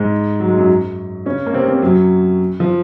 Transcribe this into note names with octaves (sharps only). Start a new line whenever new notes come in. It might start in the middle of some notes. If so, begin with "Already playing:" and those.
Already playing: G#2 G#3
F#3
G#3
F#2 F#3
C#3 C#4
A#3
C3 C4
C3 C4
F#2 F#3
F3